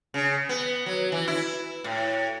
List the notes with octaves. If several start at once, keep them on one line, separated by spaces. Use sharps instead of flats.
C#3
B3
F#3
E3
E4
A2